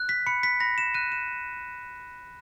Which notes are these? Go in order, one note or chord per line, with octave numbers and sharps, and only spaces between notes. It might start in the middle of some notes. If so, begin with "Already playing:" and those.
Already playing: F#6
B6
B5 C#7
B6
B5 A#6
E7
F#6 D#7
E7